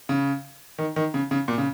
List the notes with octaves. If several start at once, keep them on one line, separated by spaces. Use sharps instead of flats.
C#3
D#3
D#3
C#3
C#3
A#2
C#3